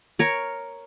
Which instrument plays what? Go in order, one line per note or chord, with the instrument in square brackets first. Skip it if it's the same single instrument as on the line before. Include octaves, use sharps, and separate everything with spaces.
[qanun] A#4 C#5